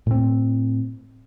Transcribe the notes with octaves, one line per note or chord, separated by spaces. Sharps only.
A2 C4